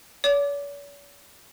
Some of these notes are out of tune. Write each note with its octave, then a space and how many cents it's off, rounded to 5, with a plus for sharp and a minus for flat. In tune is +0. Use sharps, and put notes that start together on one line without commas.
C#5 +45 D6 +0